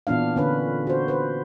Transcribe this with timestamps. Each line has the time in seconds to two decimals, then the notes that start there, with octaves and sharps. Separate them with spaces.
0.07 A#2 E3 B3 D4 F5
0.36 D3 C#4 B4
0.87 F#4 C5
1.08 B4 C5